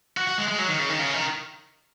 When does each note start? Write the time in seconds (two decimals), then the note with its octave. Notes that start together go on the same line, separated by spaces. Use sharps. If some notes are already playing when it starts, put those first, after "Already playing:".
0.17 F#4
0.27 F#4
0.38 G#3
0.48 G#3
0.58 F#3
0.68 D#3
0.79 C#3
0.89 D#3
0.99 C#3
1.14 D#3